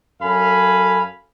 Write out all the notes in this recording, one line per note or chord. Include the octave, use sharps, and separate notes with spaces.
F#2 A4 F5 G#5 B5